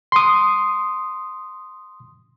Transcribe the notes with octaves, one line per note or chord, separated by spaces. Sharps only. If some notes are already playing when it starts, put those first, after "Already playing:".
C6 D#6